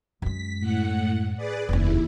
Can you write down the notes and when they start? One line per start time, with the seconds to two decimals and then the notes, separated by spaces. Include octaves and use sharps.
0.22 F#2 G#3 B6
0.60 A2 F#5
1.36 G#4 B4 D5
1.69 F1 D#2 C#3 E4